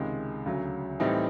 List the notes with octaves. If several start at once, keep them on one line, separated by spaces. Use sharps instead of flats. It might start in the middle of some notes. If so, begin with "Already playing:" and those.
Already playing: C#2 C3 D#3 G#3
D2 C#3 F#3
A2 E3 G3 C4 D#4